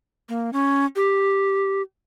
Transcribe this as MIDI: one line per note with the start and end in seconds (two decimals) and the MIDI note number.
0.29 0.50 58
0.53 0.85 61
0.96 1.82 67